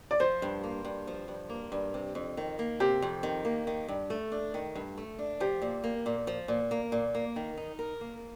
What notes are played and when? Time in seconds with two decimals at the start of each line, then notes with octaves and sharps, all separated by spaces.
0.11 D5
0.20 F3 C5
0.42 G2
0.63 A#3
0.85 G2
1.07 F3
1.28 G2
1.50 A#3
1.72 G2
1.94 C3
2.15 F2
2.37 D#3
2.59 A#3
2.80 C3 G4
3.02 F2
3.23 D#3
3.45 A#3
3.67 D#3
3.88 G2
4.10 A3
4.32 D4
4.54 D#3
4.75 G2
4.98 A3
5.19 D4
5.40 F3 G4
5.62 A#2
5.84 A#3
6.06 A#2
6.27 F3
6.48 A#2
6.71 A#3
6.92 A#2
7.15 A#3
7.36 D#3
7.57 D#4
7.79 A#4
8.01 A#3